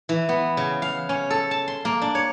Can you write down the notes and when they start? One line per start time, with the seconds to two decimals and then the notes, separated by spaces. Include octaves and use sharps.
0.09 E3
0.29 B3
0.57 C#3
0.82 F5
1.09 C#4
1.30 A4
1.51 A5
1.68 C6
1.85 A#3
2.02 D4
2.15 C#5